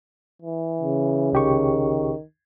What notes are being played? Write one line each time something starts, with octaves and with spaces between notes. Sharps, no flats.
E3
C#3
C2 D#3 G4 C#6